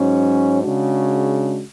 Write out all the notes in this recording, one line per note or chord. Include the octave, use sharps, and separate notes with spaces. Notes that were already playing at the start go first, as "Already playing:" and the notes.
Already playing: G#2 F#3 C#4
C#3 G#3 D4 F#4